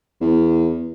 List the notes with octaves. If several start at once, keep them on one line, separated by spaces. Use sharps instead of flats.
E2